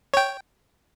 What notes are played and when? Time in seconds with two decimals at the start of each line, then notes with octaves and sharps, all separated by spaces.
0.14 C#5 G5